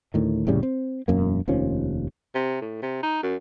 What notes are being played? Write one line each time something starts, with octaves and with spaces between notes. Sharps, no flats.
D2 A2 D#3
F1 A2 C#3 G3
C4
E1 F#2 A#3
F1 D#2 F3 C#4
C3
A2
C3
D#4
F#2